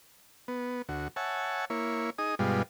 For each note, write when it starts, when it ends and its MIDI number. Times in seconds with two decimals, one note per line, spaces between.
0.48 0.82 59
0.89 1.08 38
0.89 1.08 66
1.16 1.65 73
1.16 1.65 76
1.16 1.65 78
1.16 1.65 80
1.16 1.65 81
1.70 2.10 58
1.70 2.10 64
1.70 2.10 73
2.18 2.35 63
2.18 2.35 68
2.18 2.35 87
2.39 2.63 43
2.39 2.63 47
2.39 2.63 55
2.39 2.63 56
2.39 2.63 65